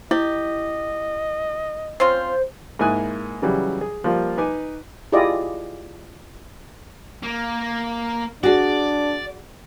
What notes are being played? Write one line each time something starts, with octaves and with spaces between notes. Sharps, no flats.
E4 G4 D#5
C4 C#4 F4 C5
G#2 A#3 E4 G#5 D#6 F#6
C#3 E3 F#3 G3
G#4
F3 G3 A#3 F4
D#4 B4 G#5 D6
E4 F4 G4 G#4 D5 D#5
A#3
D4 F#4 G#4 D5